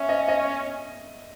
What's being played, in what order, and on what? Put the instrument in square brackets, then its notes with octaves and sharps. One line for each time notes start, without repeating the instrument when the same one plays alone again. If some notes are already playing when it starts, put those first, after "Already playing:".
Already playing: [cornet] C#4 [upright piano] E5
[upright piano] D#5
D#5